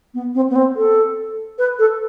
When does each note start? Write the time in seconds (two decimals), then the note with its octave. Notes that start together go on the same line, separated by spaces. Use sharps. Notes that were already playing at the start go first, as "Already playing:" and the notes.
0.14 B3
0.35 C4
0.50 B3
0.56 C4
0.76 A4
1.59 B4
1.79 A4